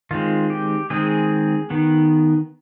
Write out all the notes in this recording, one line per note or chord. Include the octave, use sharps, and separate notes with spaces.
D#3 G#3 C4 F4
G4
D#3 G#3 C4 G#4
D#3 B3